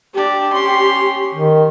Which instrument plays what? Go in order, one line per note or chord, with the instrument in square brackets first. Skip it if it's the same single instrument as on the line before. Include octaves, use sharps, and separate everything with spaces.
[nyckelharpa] D4 D5 [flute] G4
[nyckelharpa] C#4 C6
[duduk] D#3